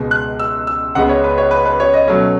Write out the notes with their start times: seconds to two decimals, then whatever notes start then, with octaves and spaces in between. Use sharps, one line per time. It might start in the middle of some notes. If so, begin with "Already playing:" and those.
Already playing: C#2 B2 G#3
0.11 F#6
0.39 E6
0.67 E6
0.95 C#2 C#3 G#3 B3 F#5
1.09 C#5
1.24 B4
1.38 C#5
1.51 B4
1.66 B4
1.80 C#5
1.94 D#5
2.08 B2 F#3 A3 C#4